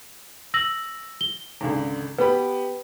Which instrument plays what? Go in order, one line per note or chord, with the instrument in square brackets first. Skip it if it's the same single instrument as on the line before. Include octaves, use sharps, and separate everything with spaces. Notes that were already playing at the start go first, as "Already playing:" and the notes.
[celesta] E6 A#6 F#7
G7
[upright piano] G#1 C#2 D3
[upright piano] B3 G4 B5 [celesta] B4